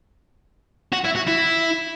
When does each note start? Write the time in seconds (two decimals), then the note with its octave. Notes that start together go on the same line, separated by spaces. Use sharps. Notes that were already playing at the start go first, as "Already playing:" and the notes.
0.92 F#4
1.05 E4
1.16 F#4
1.27 E4